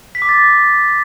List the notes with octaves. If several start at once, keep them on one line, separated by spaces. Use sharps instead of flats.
B6
D6
A6